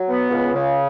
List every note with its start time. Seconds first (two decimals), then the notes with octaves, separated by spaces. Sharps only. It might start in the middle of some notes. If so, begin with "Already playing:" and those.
Already playing: F#3
0.09 B3
0.31 C#2
0.53 C#3